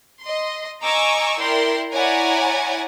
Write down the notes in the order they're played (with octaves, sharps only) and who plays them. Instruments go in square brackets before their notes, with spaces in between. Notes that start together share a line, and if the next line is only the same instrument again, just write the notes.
[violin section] D#5 C6
D#5 G#5 A#5 C#6 D6 E6
E4 A#4 D5 G5 C6
E4 C#5 D5 F#5 G#5 A#5